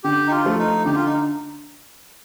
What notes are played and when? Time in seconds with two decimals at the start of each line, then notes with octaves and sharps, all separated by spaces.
0.04 D3 G4
0.27 D#4
0.31 F4
0.45 F3 A3
0.59 D#4
0.85 D3 G4
0.96 F4
1.06 D#4